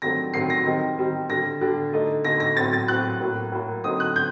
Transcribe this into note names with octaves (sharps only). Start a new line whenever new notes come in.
G2 D#3 F#3 A3 C4 A#6
G2 D#3 F#3 A3 C4 C7
A#6
D#3 G3 C4 D#4
D#3 G3 C4 D#4
D3 G3 D4 A#6
D3 G3 D4
D3 A3 D#4
D3 A3 D#4 A#6
A#6
A2 F#3 C4 A6
A6
A2 F#3 C4 F#6
A2 F#3 A#3
A2 F#3 A#3
D3 F#3 C4 D#4 D#6
F#6
D3 G6